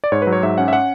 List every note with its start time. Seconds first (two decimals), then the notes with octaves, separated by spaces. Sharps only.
0.04 D5
0.12 G#2 C#5
0.22 B4
0.27 F#3
0.33 C#5
0.43 G#2 E5
0.58 C#4 F#5
0.68 E5
0.73 F#5